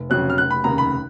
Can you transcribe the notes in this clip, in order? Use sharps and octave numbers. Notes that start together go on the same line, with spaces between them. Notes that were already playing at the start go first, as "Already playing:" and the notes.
Already playing: F1
F2 C#3 F#3 C#4 F#6
F6
F1 F#6
B5
D#2 C#3 A#5
B5